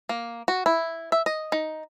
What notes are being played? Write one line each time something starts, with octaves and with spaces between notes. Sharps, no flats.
A#3
F#4
E4
E5
D#5
D#4